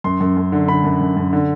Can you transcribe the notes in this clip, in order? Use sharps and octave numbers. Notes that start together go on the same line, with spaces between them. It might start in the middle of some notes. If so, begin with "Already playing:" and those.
F#2 C6
F#2
F#2
D3
D3 B5
F#2
F#2
F#2
D3